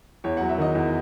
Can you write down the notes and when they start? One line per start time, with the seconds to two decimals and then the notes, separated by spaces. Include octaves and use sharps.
0.24 E2 C#5
0.37 F#3 F#5
0.49 E5
0.58 D#3 D#5
0.75 E2